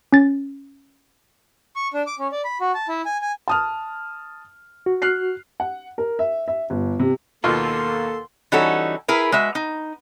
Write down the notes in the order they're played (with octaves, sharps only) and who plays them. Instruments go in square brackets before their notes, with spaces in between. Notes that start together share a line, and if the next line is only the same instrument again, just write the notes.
[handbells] C#4 A6
[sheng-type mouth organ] C#6
D4
D6
C#4
D5
B5
F#4
A5
E4
G#5
G#5
[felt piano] A5 D#6 F6
[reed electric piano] F#4
[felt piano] F6 F#6 C7
[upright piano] F#5
A#4
E5
E5
G1
C3
[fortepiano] D#2 B2 F4 [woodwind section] A#3 A4 [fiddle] C6
[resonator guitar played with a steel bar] E3 G3 C#4 D#4 F#4 A4
E4 G#4 A#4 B4
G#3 F#4 E5
D#4